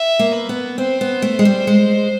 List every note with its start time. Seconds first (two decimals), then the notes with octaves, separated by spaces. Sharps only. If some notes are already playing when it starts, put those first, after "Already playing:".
Already playing: E5
0.19 A#3
0.34 B4
0.49 B3
0.78 C4 C5
1.01 B3
1.22 A3
1.39 G#3
1.45 G3
1.67 G#3